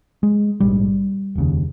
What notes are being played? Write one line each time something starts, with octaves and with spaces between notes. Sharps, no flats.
G#3
A#1 G#2 G3
F1 D#2 C#3